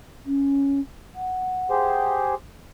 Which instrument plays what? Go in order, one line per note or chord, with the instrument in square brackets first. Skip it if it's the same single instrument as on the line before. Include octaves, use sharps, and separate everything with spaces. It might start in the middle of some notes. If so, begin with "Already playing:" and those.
[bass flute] C#4
F#5
[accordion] G4 G#4 C5